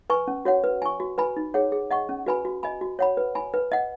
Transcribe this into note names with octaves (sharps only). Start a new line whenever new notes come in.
B4 G#5 C#6
C#4
F#4 C#5 F#5
B4
G#5 C#6
F#4
B4 G#5 B5
D#4
G#4 C#5 F#5
G#4
D#5 F#5 C#6
C#4
F#4 B4 G#5 B5
F#4
D#5 G#5 B5
F#4
C#5 F#5 B5
B4
G#5 B5
B4
D#5 F#5